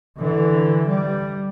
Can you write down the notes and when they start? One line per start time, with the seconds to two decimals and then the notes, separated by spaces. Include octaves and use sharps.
0.17 D3 E3
0.88 G3